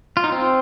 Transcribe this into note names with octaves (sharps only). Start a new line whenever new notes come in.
F4
D#4
C4